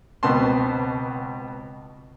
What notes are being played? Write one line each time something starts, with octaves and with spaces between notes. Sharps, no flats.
C#2 B2 B3 C4 A5 C6